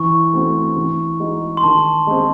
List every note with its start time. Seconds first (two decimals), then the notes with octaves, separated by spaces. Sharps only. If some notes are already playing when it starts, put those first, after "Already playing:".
Already playing: E3 C#6
0.33 A3 C4 F#4
0.76 E3
1.20 G#3 D#4 F#4
1.57 C6
1.63 D#3 A5
2.07 G#3 C4